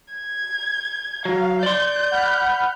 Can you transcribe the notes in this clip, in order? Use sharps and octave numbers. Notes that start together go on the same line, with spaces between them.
G#6
F#3 F5
D5 C6 G6
F#5 B5 F6